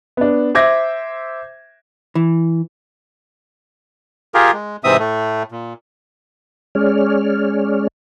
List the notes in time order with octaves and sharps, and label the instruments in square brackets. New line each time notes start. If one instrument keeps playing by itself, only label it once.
[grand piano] B3 D4
C5 E5 D6 G#6 A#6
[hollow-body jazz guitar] E3
[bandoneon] F4 G4 G#4 A#4
G#3
G#2 C3 E3 C4 E5 D#6
A2 A3
A#2
[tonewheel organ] G#3 C#4 G#4 C#5 D5 F6